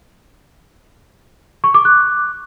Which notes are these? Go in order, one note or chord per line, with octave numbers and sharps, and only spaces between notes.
C#6
D6
F#6